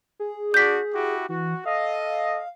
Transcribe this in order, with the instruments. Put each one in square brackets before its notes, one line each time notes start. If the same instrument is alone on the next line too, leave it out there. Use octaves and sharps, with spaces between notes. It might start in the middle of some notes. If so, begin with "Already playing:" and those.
[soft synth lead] G#4
[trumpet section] D4 F#4 D5 [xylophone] G6 B6
[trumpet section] E4 F#4 G4
[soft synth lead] E3 [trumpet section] F#4
[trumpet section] A4 D#5 [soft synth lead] F5